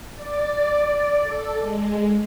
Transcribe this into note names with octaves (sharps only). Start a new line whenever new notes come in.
D5
D5
A4
G#3